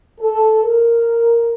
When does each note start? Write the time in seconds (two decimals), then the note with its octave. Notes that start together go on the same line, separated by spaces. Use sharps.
0.20 A4
0.63 A#4